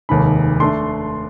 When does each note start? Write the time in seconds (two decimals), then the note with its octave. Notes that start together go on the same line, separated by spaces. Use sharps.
0.09 F1 D#2 D#3 G#3 B5
0.60 A3 D4 C6